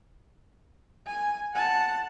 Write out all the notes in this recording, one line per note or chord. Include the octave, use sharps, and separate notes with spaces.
G#5
F#5 A5